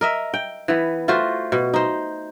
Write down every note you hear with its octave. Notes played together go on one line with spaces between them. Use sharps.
A#4 D#5 E5
G5
E3 B3
A3 F4 F#4 C5
B2
D#4 C5